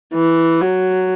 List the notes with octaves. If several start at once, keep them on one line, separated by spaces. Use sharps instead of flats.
E3
F#3